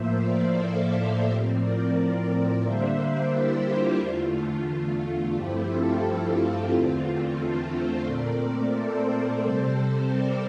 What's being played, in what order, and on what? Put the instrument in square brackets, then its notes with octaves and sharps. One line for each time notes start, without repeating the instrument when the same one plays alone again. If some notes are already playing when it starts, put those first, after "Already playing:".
Already playing: [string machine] A2 F3 A#3 C5 E5
D5 F5
A4 C5
A2 F3 C4 G4 A#4
A#4 D5
D3 G3 A#3 D4 C5 E5
E4 G4
F4
E2 D3 A3 F4
G2 F3 A3 C4 E4 G4
F4 A4
F4 A4
E4
E2 D3 A3 C4 F4
F4
F4 A4
A4 C5
A#2 A3 C4 A#4 D5
A4 C5
C3 G3 C4 A4 C5
A#4 D5